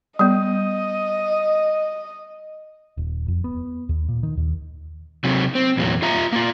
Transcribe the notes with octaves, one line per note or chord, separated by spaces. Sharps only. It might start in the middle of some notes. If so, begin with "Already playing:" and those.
G3 B3 D#5
D#1
F2
B3
D#2
A#2
D#3
D#2
C3 F#3
C4
E2 A#2 F#3
F4 E5 A#5
A#3 F4